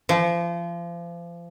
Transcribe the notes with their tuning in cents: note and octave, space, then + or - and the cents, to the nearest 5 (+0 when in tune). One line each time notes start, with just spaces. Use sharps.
F3 -30